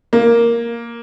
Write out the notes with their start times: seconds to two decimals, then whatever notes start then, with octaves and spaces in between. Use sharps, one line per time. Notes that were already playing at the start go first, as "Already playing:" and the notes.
0.13 A#3